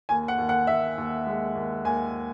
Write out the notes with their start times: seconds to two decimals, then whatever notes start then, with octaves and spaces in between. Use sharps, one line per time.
0.09 D#2 G#5
0.28 F#5
0.38 D#2
0.49 F#5
0.67 D#2 E5
0.98 D#2
1.27 G#3
1.55 D#2
1.84 D#2 G#5